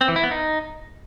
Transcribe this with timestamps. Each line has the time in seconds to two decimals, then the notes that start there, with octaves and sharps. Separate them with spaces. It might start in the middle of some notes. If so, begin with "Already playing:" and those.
0.01 C4
0.08 E3
0.16 E4
0.23 B3
0.31 D#4